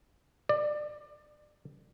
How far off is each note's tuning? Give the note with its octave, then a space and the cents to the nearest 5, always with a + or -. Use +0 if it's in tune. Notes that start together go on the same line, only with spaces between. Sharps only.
D5 +25